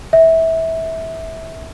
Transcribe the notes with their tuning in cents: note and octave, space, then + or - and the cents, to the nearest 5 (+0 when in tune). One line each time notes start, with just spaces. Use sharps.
E5 -20